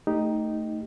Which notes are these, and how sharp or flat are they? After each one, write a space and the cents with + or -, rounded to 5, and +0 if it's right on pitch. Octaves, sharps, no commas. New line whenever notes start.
A3 +15 D#4 +0 G4 +0